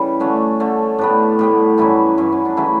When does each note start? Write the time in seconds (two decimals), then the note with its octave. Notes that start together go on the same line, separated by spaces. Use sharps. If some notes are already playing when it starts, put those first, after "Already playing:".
Already playing: C#3 E3 G3 A4
0.20 D3 A3 C#4 D4
0.60 D3 A3 C#4
0.99 A2 G3 B3 D4
1.39 A2 G3 B3
1.78 G2 E3 F#3 C#4 E4
2.18 G2 F#3 C#4
2.32 C#4
2.45 D4
2.57 C#3 E3 F#3 A3 E4